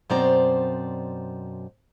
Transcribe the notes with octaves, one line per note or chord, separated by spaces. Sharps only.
F#2 B2 C4 C5 D5 A#5